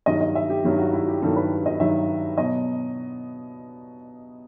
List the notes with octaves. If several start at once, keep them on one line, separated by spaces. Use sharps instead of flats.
G2 D#3 F#3 D#5
D#5
E5
G4
G2 D#3 F#3 G4
F#4
E4
G4
G2 D#3 F#3 A4
B4
D#5
G2 D#3 F#3 E5
B2 F#3 D#5